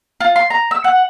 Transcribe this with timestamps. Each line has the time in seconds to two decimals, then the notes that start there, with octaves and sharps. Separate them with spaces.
0.20 F4
0.36 C6
0.50 A#5
0.71 E6
0.84 F#5